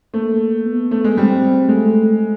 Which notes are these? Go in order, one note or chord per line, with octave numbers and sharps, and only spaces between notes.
A3 A#3
B3
A3
G#3
G3 C4
G#3 A3